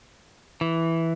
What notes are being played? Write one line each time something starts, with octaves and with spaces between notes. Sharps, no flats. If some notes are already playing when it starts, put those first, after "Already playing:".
E3